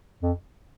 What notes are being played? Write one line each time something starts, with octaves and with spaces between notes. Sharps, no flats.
F2